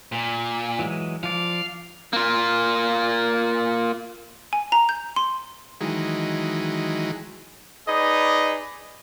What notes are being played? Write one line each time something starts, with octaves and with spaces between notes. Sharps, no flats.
A#2
E3 F#3 G#3
F3 D5 F5
A#3 F4
G#5
A#5
G6
C6
D#3 E3 F#3 G#3
D#4 G#4 B4 D5 D#5